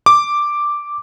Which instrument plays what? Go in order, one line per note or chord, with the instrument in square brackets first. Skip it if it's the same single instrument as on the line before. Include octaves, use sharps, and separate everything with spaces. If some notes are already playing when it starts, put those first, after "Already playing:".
[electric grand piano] D6